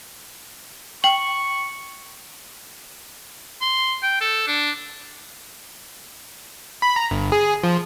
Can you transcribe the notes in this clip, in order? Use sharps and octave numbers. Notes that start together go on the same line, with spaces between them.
G5 C#6 F#7
C6
G5
A4
D4
B5
A#5
G1
G#4
F3